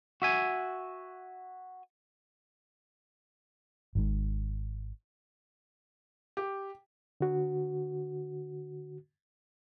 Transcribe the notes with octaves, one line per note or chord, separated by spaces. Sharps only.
F#4 E5 G#5
G#1 G#2
G4
D3 F#4